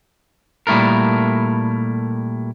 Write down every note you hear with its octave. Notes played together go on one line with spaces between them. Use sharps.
A#2 G3 A3 E4 A4 A#4